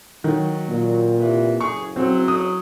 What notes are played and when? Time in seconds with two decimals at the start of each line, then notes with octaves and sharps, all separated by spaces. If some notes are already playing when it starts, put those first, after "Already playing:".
0.24 D#3 F#3
0.68 A#2
1.20 C3 E3 B4
1.61 F#1 G#4 C#6
1.96 F#3 C4
2.28 D#6